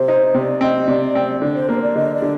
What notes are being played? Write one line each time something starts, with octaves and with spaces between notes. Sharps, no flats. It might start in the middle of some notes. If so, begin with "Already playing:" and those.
Already playing: C3 C5
D#4
D#5
C3 D5
C4 D#5
C3 D5
C4
D3 D5
C5
A#3 D5
C5
D5
D3 D#5
D5
D3